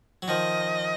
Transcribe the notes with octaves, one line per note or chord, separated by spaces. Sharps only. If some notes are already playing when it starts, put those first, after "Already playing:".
F#3
D#3 F3 D#5